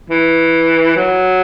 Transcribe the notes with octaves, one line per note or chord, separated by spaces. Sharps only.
E3
F#3